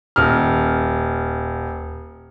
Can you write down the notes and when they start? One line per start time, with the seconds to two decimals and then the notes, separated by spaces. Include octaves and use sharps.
0.16 D#1 F6